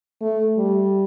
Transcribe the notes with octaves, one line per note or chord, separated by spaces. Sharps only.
A3
G3